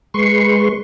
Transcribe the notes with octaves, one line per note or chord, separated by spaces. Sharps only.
G#3 B4 C6 C#6